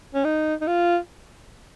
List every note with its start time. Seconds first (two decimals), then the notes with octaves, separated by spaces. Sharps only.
0.14 C#4
0.24 D#4
0.61 D#4
0.67 F4